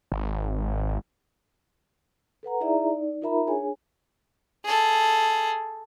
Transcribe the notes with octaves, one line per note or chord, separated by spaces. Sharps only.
G#1
A4 B4 F#5 A#5
D#4 E4 G#4 D5 E5 A#5
D#4 D5
D#4 F4 A#4 E5 A#5 B5
D4 G#4 C#5 G#5
G#4 A4